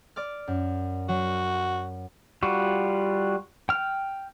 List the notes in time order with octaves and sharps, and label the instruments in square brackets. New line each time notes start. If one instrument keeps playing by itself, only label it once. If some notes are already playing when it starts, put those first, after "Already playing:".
[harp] D5 D6 F6
F#2
[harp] F#3 [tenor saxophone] F#4
[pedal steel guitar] G3 F4 F#4
G5 F6